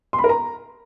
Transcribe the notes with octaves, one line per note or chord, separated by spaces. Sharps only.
C6
B5
A#4
A#5